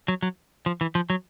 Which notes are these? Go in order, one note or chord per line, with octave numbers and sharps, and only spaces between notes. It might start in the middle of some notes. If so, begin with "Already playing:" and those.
F#3
F#3
F3
E3
F3
F#3